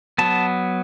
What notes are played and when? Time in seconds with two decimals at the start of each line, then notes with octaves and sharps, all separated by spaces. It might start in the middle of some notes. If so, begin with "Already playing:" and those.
0.18 F#3 B3 A5